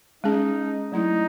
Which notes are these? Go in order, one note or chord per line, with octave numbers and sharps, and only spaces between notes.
G#3 C#4 D#4 G#4
F#3 A3 D#4 E4